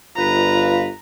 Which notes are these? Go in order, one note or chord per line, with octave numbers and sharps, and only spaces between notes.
G1 F4 B4 A#5